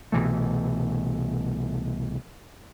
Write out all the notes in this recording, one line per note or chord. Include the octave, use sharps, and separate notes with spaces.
C2 B2 E3 A3